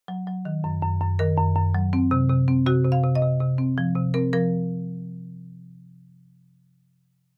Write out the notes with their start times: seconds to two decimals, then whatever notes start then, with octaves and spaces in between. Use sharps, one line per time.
0.08 F#3
0.27 F#3
0.45 D#3
0.64 F#2
0.82 F#2
1.01 F#2
1.19 D#3 A#4
1.37 F#2
1.56 F#2
1.75 F#3
1.93 C4
2.11 C3
2.29 C3
2.48 C4
2.66 C3 F#4
2.85 C3
2.92 F5
3.03 C3
3.15 D#5
3.22 C3
3.40 C3
3.58 C4
3.78 F3
3.95 C3
4.14 C4 A#4
4.33 F3 A#4